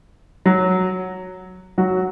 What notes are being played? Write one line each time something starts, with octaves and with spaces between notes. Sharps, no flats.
F#3 F#4
F#3 F#4